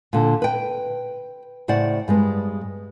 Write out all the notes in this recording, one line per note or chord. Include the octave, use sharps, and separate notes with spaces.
A#2 D3
B4 G5
A2 C#3 C5 D5 F#5
G2 G#3 B3